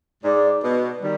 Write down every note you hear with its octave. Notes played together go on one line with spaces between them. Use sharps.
G#2 D5
B2
D#3 G3